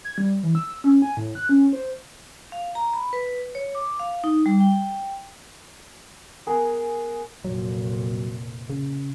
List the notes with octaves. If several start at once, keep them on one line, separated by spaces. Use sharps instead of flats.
G#6
G3
E3
E6
E6
C#4
G#5
A2
F#6
C#4
C5
F5
A#5
B5
B4
C#5
D6
F5
D#4
G3
G5
B3 G#4 A#4
F1 A#2 F#3
C#3